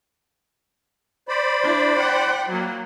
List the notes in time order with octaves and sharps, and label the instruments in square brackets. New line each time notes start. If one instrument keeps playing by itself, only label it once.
[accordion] C5 D5 B5
[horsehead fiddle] D4 E4
F#5 G5
F#3 A#3